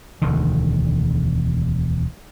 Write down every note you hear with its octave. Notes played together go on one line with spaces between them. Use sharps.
E1 D2 D3 D#3